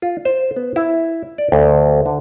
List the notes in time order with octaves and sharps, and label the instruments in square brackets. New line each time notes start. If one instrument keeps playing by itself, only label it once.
[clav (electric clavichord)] F4
C5
B3
E4
D5
D2
D3